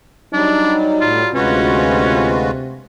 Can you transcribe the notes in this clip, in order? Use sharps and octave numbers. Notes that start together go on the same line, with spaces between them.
F#3 G3 D4 D#4
A2 F4
D2 C3 G#3 C#4 F4 F#4 B4